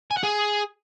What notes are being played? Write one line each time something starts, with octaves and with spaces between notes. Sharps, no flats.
G#5
F#5
G#4